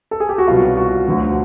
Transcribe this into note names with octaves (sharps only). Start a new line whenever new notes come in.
A4
G#4
G4
F#4
C2 B2 F#3 F4
F#4
D2 D3 F#3